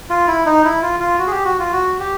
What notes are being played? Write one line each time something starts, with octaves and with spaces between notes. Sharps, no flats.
F4
E4
D#4
E4
F4
F4
F#4
G#4
G4
F#4
F4
F#4
G4